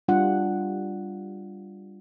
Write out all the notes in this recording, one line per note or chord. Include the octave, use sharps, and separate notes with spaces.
G3 D4 F4 F#5